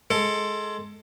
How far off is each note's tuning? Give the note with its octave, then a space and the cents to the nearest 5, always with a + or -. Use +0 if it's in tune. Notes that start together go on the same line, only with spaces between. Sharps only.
G#3 +20 A4 +15